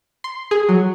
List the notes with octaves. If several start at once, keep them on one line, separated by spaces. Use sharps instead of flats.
C6
G#4
F#3